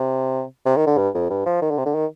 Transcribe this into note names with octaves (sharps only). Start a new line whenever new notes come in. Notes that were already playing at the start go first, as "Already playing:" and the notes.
Already playing: C3
C3
D#3
D3
G2
F2
G2
F3
D#3
D3
C3
D3
D#3